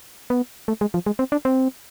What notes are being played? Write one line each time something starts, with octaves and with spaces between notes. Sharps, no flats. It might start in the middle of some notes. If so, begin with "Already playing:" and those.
B3
A3
G#3
F3
G#3
C4
D4
C4